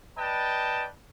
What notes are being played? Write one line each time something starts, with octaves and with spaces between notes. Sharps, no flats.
B4 D5 D#5 G5 A5